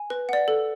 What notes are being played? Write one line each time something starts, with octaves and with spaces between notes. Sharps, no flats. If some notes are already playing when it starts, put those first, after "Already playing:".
Already playing: G#5
B4
D5 F#5
A4